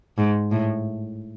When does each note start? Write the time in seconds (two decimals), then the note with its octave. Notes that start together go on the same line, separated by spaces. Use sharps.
0.18 G#2
0.52 A2